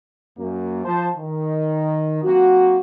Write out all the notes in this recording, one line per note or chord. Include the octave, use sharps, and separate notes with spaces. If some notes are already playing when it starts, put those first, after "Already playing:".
F#2 A#3
F3 C5 A5
D#3
F#3 A#3 C4 F#4